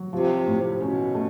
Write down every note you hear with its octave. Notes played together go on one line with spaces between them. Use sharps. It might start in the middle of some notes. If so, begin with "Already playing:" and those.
Already playing: F#3
C3 F3
A2
B2 C#4
A3